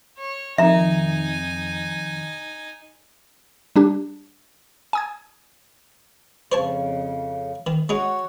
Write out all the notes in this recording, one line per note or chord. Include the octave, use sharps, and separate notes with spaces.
C#5
F2 C3 D#3 D#4 E5 G#5 A#5
G3 D4 G4
G#5 D#6 G#6
F2 C#3 C5 C#5 A5
D#3
G#3 D#4 F#4 C#5 F#5